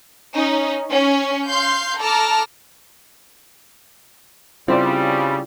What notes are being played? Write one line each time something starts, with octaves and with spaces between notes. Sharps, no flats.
C#4 D#4
C#4
F5 C6 G6
A4 A5 A#5 D6 F6
C#3 G3 C4 E4 F4 C5 D5